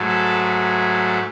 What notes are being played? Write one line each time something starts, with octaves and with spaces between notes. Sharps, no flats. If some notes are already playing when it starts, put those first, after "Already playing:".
Already playing: G#2 F#3 A3
A4